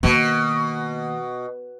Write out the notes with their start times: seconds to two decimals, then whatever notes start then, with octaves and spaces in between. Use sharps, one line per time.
0.03 B2 D#3 A#3